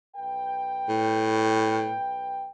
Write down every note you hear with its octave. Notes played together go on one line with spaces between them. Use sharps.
B1 B4 G5
A2